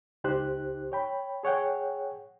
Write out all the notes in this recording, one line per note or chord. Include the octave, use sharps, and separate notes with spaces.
C#2 D#4 G4 C5 F#6
C#5 G5 B5
G#4 C#5 F#5 G5